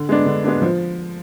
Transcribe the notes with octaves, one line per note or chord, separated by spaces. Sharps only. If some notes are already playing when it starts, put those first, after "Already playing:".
Already playing: D3
G#3 B3 D4
D3
G#3 B3 D4
F3